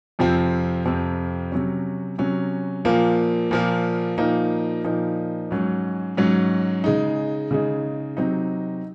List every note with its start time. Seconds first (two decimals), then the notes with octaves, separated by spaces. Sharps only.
0.19 F2 C3 F3 C4
0.86 F2 C3 F3 C4
1.52 C3 F#3 C#4
2.18 C3 F#3 C#4
2.85 A#2 F3 A#3
3.51 A#2 F3 A#3
4.18 A#2 F3 A#3 D#4
4.84 A#2 F3 A#3 D#4
5.51 G#2 F#3 C#4
6.17 G#2 F#3 C#4
6.84 C#3 G#3 D#4
7.51 C#3 G#3 D#4
8.17 C3 F#3 C4 D#4